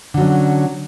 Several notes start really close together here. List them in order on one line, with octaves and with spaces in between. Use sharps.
D3 F#3 C#4